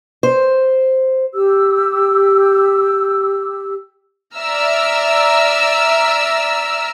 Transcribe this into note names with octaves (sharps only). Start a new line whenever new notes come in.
C5
G4 E6
D5 E5 A#5 E6 F6